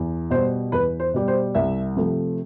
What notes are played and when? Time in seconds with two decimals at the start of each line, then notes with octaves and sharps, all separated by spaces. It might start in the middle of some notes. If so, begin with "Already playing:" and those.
Already playing: E2
0.30 B2 G3 C5
0.72 E2 B4
1.00 C5
1.14 B2 G3
1.28 C5
1.55 C2 E5
1.96 C3 F3 A3